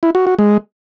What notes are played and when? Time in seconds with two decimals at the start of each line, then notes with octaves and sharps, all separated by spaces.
0.03 E4
0.15 F#4
0.27 F#4
0.39 G#3